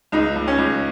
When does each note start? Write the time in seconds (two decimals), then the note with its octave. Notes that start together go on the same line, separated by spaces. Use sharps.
0.12 C#2 D#4
0.36 C#2
0.48 C#4
0.58 C#2